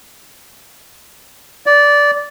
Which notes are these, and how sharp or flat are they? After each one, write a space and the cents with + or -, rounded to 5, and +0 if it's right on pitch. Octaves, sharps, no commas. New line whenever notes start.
D5 -15